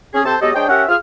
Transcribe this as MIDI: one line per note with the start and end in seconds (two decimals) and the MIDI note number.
0.14 0.22 61
0.14 0.22 68
0.25 0.36 48
0.25 0.36 60
0.25 0.36 69
0.25 0.36 72
0.25 0.36 81
0.42 0.51 54
0.42 0.51 56
0.42 0.51 59
0.42 0.51 67
0.42 0.51 69
0.42 0.51 75
0.55 0.66 56
0.55 0.66 62
0.55 0.66 72
0.55 0.66 73
0.55 0.66 75
0.55 0.66 79
0.69 0.83 61
0.69 0.83 67
0.69 0.83 70
0.69 0.83 76
0.69 0.83 78
0.89 0.96 65
0.89 0.96 68
0.89 0.96 89